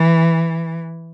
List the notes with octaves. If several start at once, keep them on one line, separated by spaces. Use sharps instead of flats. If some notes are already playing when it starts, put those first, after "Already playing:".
Already playing: E3